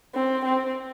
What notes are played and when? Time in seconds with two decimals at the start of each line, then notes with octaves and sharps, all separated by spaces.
0.14 C4
0.44 C4